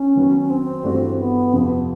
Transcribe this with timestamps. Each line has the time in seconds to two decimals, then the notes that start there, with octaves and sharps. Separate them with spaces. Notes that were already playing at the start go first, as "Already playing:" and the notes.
Already playing: C#4
0.16 D#3 F#3 B3
0.41 C#4
0.50 C4
0.83 G2 E3 A3 D4 F#4
1.18 B3
1.53 F2 C3 F3